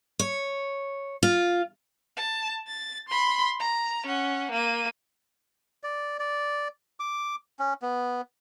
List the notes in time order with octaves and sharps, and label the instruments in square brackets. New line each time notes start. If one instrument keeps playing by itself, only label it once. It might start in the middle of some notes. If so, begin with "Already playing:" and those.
[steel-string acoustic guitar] C#5
F4
[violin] A5
A6
B5 C6
A#5
C#4 F#5
A#3 D#7
[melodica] D5
D5
D6
C#4
B3